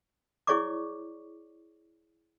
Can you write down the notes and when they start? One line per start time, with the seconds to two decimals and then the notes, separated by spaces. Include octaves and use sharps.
0.47 E4 G#4 C#5 D5 C#6 D6